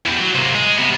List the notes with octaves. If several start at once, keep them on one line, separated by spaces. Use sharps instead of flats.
E2 G3
F#3
C3 A#3
G#3
C3 B3